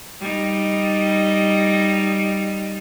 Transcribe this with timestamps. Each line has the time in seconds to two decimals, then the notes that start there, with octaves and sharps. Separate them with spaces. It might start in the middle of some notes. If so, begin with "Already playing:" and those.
0.21 G3 D#4